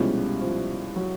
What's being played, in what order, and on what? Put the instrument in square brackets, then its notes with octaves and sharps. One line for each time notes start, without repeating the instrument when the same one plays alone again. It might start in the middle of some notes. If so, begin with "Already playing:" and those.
Already playing: [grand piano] C2 B2 G#3 C#4 F4 [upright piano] F3 G3
[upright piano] F3
F#3